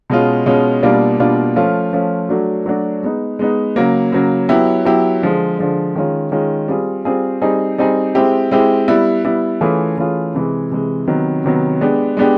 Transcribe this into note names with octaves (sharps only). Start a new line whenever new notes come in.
B2 G#3 C#4 F4
B2 G#3 C#4 F4
B2 G3 A#3 D4 F4
B2 G3 A#3 D4 F4
F3 A3 C#4 F4
F3 A3 C#4 F4
F#3 A3 D4 F#4
F#3 A3 D4 F#4
G#3 B3 D#4
G#3 B3 D#4
C#3 F#3 A#3
C#3 F#3 A#3
F#3 B3 E4 G4
F#3 B3 E4 G4
D3 F3 G#3
D3 F3 G#3
D#3 G#3 C#4 F4
D#3 G#3 C#4 F4
G3 C4 F4 G#4
G3 C4 F4 G#4
G3 C4 D#4 G#4
G3 C4 D#4 G#4
G#3 C4 E4 G4
G#3 C4 E4 G4
G3 B3 E4
G3 B3 E4
E3 A3 C#4 F4 G#4
E3 A3 C#4 F4 G#4
C3 E3 G#3
C3 E3 G#3
C3 D#3 F#3 B3
C3 D#3 F#3 B3
G#3 B3 D4 G4
G#3 B3 D4 G4